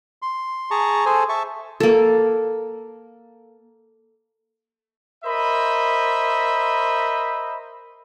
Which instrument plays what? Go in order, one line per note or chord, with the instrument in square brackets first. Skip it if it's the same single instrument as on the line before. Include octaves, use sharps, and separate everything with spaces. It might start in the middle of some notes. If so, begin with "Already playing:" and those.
[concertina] C6
G#4 A5 A#5 C#6
G#4 A4 C5 G#5
E5 A5 C#6
[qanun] A#3 A4
[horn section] A#4 C5 D#5 E5 B5